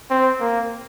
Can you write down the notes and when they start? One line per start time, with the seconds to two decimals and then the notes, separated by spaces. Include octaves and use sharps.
0.10 C4
0.40 A#3